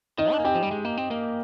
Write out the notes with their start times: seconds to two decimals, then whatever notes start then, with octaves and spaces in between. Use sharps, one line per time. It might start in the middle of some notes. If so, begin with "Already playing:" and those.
0.18 D#3 D#4 D#5
0.32 D4
0.37 A#3 G#5
0.44 C4 G4 G5
0.55 F3
0.63 G3
0.71 G#3
0.85 A#3
0.97 C4
1.11 A#3